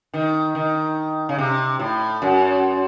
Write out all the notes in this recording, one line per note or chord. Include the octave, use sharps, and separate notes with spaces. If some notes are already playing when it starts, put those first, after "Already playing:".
D#3
D#3
C#3
C3
A2
F#2